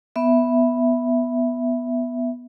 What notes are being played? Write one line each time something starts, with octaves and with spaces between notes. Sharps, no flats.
B3 E5